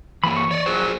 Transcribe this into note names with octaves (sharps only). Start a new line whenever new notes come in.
E3 A#3 B5
C#6
C#5 D5
F#3 F4 G#4 C5